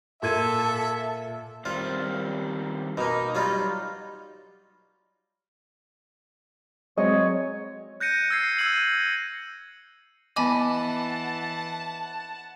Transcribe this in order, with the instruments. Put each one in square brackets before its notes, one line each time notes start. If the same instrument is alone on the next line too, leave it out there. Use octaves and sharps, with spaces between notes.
[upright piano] A#2 G#6 D#7 [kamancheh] A4 [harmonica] E5
[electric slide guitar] D#3 G3 C4 [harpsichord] F4
[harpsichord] B2 A#3 [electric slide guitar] D#4
[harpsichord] F#3 G3 F4
[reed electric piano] F#3 G#3 C4 [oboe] C#5 [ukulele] D#5
[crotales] F#6 G6 A#6 C#7 D#7
E6 G#6 C7
E6 G#6 D#7 F#7
[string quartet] E3 [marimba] B3 D6 [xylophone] D#5 G#5 B5 [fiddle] F#5 A5